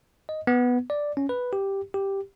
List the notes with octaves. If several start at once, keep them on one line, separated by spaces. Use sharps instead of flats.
D#5
B3
D5
C#4
B4
G4
G4